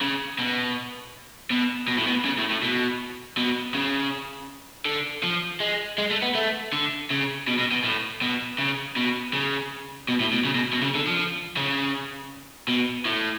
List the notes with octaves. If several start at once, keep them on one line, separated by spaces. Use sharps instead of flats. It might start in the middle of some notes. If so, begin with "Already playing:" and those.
C#3
B2
B2
B2
A2
B2
C#3
A2
A2
B2
B2
C#3
D3
F3
G#3
G#3
A3
B3
A3
D3
C#3
B2
B2
B2
A2
B2
C#3
B2
C#3
B2
A2
B2
C#3
B2
B2
C#3
D3
F3
C#3
B2
A2